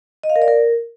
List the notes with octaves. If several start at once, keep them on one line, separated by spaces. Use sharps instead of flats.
D#5
F5
A#4
D5
A#4